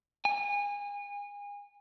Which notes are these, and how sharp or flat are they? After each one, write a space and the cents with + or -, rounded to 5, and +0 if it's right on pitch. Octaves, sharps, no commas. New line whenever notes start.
G#5 -30